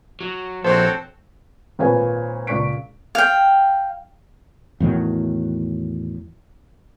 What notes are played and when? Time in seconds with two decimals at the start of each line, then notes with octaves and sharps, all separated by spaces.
0.21 F#3
0.65 A#1 C4 F#4 A4 C5 C#5
1.79 G#1 A#2 G#4 B4 C#5 G#5
2.47 C#2 A#2 D5 C#6 B6 D7
3.15 F5 G5
4.80 E2 A2 D#3 F#3